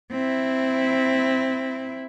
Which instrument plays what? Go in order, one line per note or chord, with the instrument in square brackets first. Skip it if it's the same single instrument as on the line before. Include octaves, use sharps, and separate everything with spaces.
[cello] C4 E4